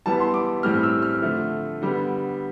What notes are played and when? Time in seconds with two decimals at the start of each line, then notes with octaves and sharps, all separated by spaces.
0.06 E3 G3 B3 A5
0.20 C6
0.34 D6
0.63 A2 E3 G3 C4 F6
0.83 E6
1.02 F6
1.22 D3 F3 A3
1.82 D3 G3 B3